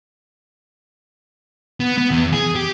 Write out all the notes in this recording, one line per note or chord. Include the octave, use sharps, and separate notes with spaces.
B3
B3
E2
G#4
G4